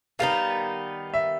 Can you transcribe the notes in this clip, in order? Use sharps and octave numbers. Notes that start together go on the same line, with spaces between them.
D#3 G3 B3 D#4 F5
E5